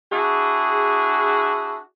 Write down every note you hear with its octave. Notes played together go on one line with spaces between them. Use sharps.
D4 E4 F#4 G#4